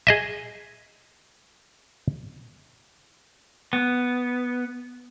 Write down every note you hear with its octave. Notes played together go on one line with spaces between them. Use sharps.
G#4 D#5 E5
B3